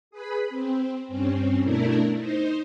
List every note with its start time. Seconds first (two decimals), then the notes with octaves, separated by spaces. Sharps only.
0.11 G#4 B4 B5
0.49 C4
1.08 G2 C4 C#4
1.62 B2 A3 D4 E4 A#4
2.17 D#4 C5